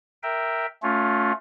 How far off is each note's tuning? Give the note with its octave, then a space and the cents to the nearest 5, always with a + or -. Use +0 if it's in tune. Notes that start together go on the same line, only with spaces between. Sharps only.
A#4 +0 E5 +0 G5 +0
A3 +0 C#4 +20 F4 +20